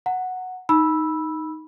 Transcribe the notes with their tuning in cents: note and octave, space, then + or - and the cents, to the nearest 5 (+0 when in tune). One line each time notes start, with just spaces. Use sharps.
F#5 -5 A#5 -30
D#4 +0 B5 -15 E6 +0